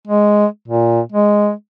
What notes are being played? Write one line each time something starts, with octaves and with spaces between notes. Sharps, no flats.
G#3
A#2
G#3